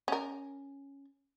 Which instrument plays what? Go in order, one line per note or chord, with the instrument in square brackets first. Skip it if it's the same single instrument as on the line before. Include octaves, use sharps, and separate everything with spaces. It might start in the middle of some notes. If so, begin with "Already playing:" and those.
[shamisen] C#4 A#4